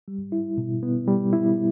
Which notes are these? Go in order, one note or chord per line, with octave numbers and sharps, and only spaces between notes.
G3
E4
B2
B3
G3
E4